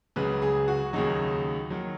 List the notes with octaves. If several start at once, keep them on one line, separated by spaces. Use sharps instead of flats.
C#2 C#3 F#3 B4
G#4
F#4
D#2 C#3 F#3 D#4
D#3 F#3